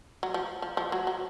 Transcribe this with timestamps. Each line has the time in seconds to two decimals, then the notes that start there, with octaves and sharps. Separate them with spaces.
0.23 F#3
0.34 F3
0.62 F3
0.77 F3
0.92 F#3
1.07 F#3